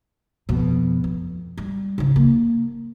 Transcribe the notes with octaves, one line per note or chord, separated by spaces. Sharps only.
F2 B2
F2
G3
G#2 C#3
A#3